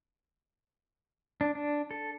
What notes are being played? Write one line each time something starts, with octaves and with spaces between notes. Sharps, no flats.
D4
D4
A4